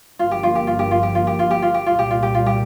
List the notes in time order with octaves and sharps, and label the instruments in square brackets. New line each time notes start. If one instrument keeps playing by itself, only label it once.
[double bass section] G1 G2 F3 A#3 [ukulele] F4
[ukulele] G4
F4
G4
F4
G4
F4
G4
F4
G4
F4
G4
F4
G4
[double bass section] C2 A#2 G3 [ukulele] F4
[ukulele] G4
F4
G4
F4
G4